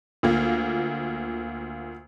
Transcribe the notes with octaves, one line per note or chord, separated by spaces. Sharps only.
D2 A#3 F4